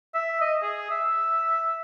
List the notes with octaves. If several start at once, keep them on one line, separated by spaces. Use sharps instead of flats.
E5
D#5
G#4
E5